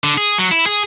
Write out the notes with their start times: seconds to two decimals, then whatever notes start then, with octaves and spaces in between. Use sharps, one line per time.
0.04 D3
0.18 G#4
0.38 F#3
0.51 E4
0.66 G#4